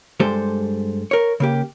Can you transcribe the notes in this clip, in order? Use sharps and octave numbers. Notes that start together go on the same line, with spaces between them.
G2 G#3 G4 A4 C5
A#4 C#5
C#3 A#3 G4